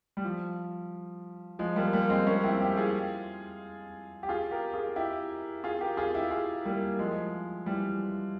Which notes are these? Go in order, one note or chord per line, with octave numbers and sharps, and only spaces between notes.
G3
F3
F3 G#3
G3 A#3
G3 A#3
G#3 C4
A#3 C#4
C4 E4
E4 G4
F4 G#4
G4
F4 G#4
G4 A#4
F4 G#4
E4 G4
F4 G#4
G4 A#4
F4 G#4
E4 G4
F4 G#4
G3 A#3
F3 G#3
E3 G3